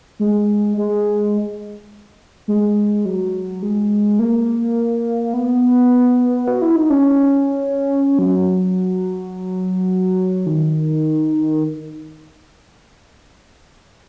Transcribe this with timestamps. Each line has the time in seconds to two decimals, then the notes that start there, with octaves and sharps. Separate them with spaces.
0.20 G#3
0.77 G#3
2.48 G#3
3.05 F#3
3.62 G#3
4.19 A#3
5.34 B3
6.47 F#4
6.62 E4
6.76 D#4
6.90 C#4
8.19 F#3
10.46 D#3